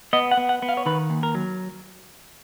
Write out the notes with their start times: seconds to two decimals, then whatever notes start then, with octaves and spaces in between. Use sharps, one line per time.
0.13 B3 D#5
0.31 F#5
0.37 B3
0.49 F#5
0.62 B3
0.69 F5
0.77 C#5
0.86 D#3 B4
1.10 D#2
1.23 A#4
1.35 F#3